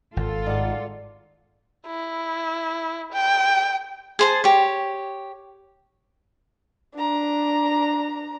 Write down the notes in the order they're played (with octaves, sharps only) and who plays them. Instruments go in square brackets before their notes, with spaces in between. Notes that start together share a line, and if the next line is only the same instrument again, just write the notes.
[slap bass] G#1 [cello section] F4 A4
[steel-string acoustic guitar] G#2 F#5 [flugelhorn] D5
[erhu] E4
G5
[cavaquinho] G#4 C5 A5
G4 C#5
[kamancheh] D4 A#5